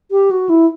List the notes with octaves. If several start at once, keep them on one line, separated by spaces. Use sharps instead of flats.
G4
F#4
E4